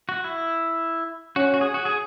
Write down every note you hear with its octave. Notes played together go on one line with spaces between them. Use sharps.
F#4
E4
C#4 F#4
F#4
G#4
F#4
G#4